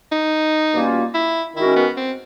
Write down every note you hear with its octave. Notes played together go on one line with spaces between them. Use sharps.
D#4
B2 G3 A#3 C#4 F4
E4
D#3 G#3 C#4 E4 F#4 A#4
B3
C4